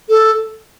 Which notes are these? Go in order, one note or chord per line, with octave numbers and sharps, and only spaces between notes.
A4